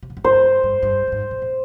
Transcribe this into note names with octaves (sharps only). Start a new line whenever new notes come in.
C3
A#2
G#2
G2 C5
G2
G2
A#2
G#2
A#2
A#2